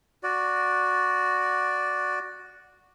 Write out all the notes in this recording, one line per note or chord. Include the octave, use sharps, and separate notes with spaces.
F#4 D5